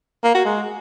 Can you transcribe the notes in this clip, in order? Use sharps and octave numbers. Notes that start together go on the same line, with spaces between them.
A#3
F#4
G#3